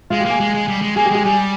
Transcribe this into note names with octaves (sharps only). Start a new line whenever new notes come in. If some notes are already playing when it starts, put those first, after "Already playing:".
G#3 F4
A#3 G4
G#4
G#3
G#3
G3
G#3
A#3 G#4
G4
G#3 G#4
G3 G#4